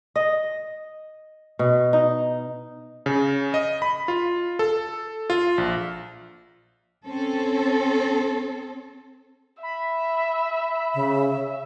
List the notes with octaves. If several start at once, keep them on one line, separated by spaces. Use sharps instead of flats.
D#5
B2
D#4
C#3
D#5
B5
F4
A4
F4
A#1
C4 C#4 A4
E5 B5
C#3